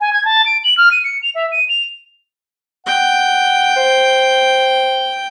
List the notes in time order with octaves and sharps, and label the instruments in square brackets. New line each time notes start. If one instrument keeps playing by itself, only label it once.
[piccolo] G#5
G#6
A5
D7
F#7
F6
D#7
C#7
F7
E5
D#7
F7
[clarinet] F#5 [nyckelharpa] G5
[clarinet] C5